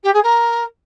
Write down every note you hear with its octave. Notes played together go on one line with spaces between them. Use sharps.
G4
G#4
A#4